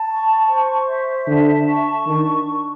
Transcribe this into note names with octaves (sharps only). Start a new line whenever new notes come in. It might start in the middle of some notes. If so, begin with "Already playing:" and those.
Already playing: A5
C#6
C5
E5
D3 A5
C#6
D#3 D4